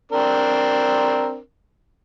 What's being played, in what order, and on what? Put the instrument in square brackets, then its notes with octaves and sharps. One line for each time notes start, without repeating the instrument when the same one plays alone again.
[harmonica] C4 D4 A#4